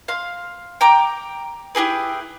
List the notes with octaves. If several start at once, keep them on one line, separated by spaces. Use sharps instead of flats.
F5 C6
G5 A#5 D6
E4 G4 G#4 B4